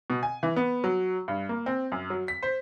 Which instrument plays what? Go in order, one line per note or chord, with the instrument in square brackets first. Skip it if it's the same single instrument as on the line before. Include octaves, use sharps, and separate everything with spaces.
[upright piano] B2
G#5
E3
B3
F#3
G2
A#3
C4
F#2
F#3
B6
C5